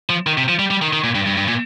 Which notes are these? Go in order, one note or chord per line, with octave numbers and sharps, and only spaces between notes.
F3
D#3
C3
F3
G3
G3
D#3
D#3
A#2
G2
G2
G2
A#2